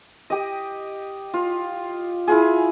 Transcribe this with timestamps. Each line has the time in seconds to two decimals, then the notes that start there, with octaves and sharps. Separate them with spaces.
0.30 G4 D#5
1.34 F4
2.28 E4 F4 G#4